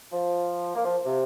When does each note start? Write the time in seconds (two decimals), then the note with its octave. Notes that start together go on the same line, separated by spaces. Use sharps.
0.12 F3
0.75 A#3
0.85 F3
1.06 C3